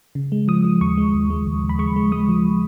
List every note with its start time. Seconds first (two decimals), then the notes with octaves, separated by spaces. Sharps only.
0.15 C#3
0.32 G#3
0.48 F3 D#6
0.64 F3
0.81 D#2 C#6
0.98 G#3
1.14 D#2
1.30 G#3
1.46 D#2
1.64 D#2
1.69 B5
1.79 G#3 C#6
1.96 G#3
2.12 G#3 D#6
2.28 F3